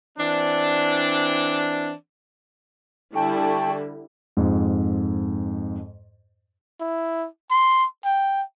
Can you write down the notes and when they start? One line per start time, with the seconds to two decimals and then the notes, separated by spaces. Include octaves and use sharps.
0.18 E3 C4 D4
3.15 D3 G3 E4 G5 A5 C#6
4.37 F2 G#2
6.81 E4
7.51 C6
8.05 G5